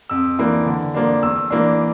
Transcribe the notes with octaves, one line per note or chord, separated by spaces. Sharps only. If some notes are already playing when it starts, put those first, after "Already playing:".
F2 E6
E3 A#3 D4
D3
F3 A#3 D4
E2 E6
E3 A#3 D4